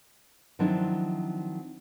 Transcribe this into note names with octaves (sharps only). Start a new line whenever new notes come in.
D#3 F3 F#3 C4 D4 E4